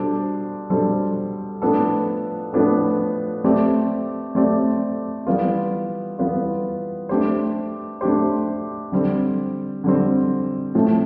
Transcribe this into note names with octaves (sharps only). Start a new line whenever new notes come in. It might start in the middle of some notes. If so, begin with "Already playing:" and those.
Already playing: B2 G3 D4 A4 C5
B2 G3 D4 A4 C5
A2 F3 B3 D4 A4
A2 F3 B3 D4 A4
A3 C4 G4 D5
A3 C4 G4 D5
E3 G3 B3 F4
E3 G3 B3 F4
A3 D4 G4 C5
A3 D4 G4 C5
D3 G3 C4
D3 G3 C4
A2 F3 A3 C4